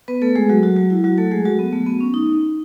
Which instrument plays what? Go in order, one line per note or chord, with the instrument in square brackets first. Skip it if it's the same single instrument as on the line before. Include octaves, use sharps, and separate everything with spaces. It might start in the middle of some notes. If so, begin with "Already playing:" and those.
[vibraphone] B3 B4
A3 A4
G#3 G#4
F#3 F#4
F#3 F#4
F#3 F#4
E4
F#3 F#4
A3 A4
G#3 G#4
F#3 F#4
B3
A3
B3
C#4
D#4